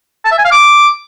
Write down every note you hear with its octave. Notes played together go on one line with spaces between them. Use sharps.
A5
E5
G#5
F5
D6